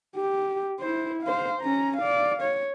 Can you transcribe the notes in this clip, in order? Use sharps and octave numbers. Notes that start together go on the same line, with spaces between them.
G4
E4 C5
C5 F5
C#4 A#5
D5 F5
C#5